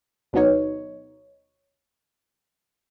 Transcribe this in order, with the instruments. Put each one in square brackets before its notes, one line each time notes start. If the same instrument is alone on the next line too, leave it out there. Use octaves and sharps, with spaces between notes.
[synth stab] D2 B2 F#3 B3 D#4 C#5